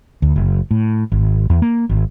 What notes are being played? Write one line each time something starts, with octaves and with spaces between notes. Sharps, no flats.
D2
F#1
A2
G#1
E2
A#3
G#1